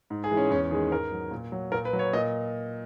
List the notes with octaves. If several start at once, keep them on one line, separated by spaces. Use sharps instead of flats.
G#2
G#4
E3 G#3
C#4
E2 C#4
D#3 G#3 G#4
G#2 A#4
F#3
A#2
F#3
A#2 A#4
B4
F#3
C#5
A#2 D#5